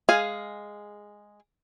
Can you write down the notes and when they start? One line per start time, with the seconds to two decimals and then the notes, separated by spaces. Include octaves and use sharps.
0.09 G#3 G#4 F5 G#5